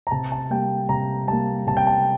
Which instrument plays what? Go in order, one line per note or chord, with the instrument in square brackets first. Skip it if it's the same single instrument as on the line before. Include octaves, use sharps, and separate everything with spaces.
[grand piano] A#5
C3 A5
A5
G3 A#3 G5
C3 A#5
G3 A#3 A5
C3 A5
G5
A5